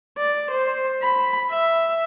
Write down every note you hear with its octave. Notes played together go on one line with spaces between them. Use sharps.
D5
C5
B5
E5